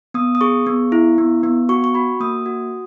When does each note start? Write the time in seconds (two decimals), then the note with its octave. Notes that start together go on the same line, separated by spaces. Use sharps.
0.14 B3 D#6
0.35 D#6
0.41 G#4 C#6
0.67 B3
0.92 E4
1.18 B3
1.43 B3
1.69 F#4 C#6
1.84 C#6
1.94 F#4 B5
2.20 A#3 D#6
2.46 F#4